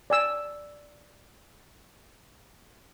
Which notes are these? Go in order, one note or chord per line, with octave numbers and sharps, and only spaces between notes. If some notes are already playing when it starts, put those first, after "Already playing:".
D5 G#5 E6